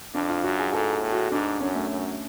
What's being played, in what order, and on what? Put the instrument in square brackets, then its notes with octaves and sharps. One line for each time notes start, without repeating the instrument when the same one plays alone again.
[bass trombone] F2 [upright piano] D4
[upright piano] F4
[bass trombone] F#2 [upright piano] F#4
[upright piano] G#4
[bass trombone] G#2 [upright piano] A4
[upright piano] G#4
[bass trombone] A2
[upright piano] F#4
[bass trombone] G#2 [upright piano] D4
[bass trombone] F#2 [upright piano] C#4
[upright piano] A3
[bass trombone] F#2